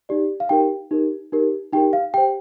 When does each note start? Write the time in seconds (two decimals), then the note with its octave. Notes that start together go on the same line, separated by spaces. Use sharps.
0.09 D#4 G4 D5
0.40 F5
0.49 D#4 G4 A#4 G5
0.91 D#4 G4 A#4
1.33 D#4 G4 A#4
1.72 D#4 G4 A#4 G5
1.93 F5
2.14 G4 G5
2.18 C5